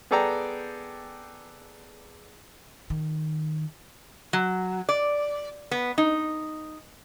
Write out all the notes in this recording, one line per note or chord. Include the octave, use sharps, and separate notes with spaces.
B3 G#4 A4 D5 G5 A#5
D#3
F#3
D5
B3
D#4